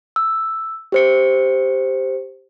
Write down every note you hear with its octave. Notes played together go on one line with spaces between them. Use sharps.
E6
G4 C5 C#7